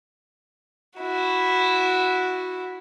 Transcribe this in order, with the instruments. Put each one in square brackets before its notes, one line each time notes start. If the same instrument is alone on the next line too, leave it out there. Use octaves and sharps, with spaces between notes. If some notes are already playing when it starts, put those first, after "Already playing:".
[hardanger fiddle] E4 F#4